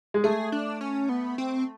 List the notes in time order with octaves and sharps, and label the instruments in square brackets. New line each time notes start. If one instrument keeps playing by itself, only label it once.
[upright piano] G#3
[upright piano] A3 [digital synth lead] G#4
[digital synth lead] D4
C#4
B3
C4